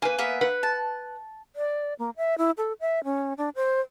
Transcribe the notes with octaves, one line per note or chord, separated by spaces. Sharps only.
A#3 B4 G#5
A#3 B3 E5
B4 F#5
A5
D5
A#3
E5
E4
A4
E5
C#4
D4
C5